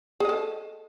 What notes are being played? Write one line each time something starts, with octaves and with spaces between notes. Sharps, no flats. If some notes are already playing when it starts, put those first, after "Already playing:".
G#4 A4 D#5